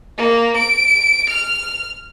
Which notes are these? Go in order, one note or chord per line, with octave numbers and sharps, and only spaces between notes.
A#3
D7
F6